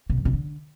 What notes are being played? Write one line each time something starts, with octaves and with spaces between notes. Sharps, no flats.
B2
F#2
C3
D3